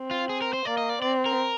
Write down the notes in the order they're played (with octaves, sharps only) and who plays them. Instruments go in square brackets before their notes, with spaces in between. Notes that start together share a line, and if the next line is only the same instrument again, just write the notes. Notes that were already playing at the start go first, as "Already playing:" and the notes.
Already playing: [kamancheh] C4
[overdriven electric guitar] F4
G#4
A#4
C5
[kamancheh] A#3 [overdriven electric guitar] D5
[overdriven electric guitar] D#5
D5
[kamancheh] C4 [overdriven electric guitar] D5
[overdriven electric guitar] A#4